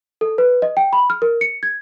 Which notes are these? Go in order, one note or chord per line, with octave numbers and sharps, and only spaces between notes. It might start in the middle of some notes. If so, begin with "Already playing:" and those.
A4
B4
D#5
G5
B5
F6
A#4
C#7
G#6